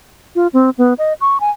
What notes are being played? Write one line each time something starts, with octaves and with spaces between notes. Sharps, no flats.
F4
C4
B3
D#5
C#6
G#5